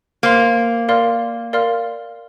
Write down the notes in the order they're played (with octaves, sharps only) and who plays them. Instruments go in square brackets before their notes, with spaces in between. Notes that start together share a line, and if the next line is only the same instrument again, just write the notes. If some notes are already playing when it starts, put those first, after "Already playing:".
[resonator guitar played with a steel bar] A#3 [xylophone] C5 F5 C6
[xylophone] A#4 D5 F5 C6 F6
A#4 D5 F5 C6 F6